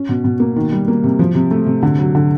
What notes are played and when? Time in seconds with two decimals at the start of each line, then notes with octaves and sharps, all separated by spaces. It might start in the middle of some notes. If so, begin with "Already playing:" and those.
Already playing: C#4
0.09 B2
0.24 B2
0.40 A#3
0.56 D#3
0.72 G3
0.88 A#3
1.04 C3
1.19 F3
1.35 C3
1.51 A3
1.66 C3
1.83 D3
1.99 F#3
2.15 D3